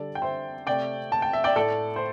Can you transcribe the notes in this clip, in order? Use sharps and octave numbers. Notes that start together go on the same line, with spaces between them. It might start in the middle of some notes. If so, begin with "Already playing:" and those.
Already playing: D3 G3 A4 D5
G5
C5 E5
C3 A3 D5 G5
A5
G5
E5
D5 G5
A2 A3 A4 D5
C5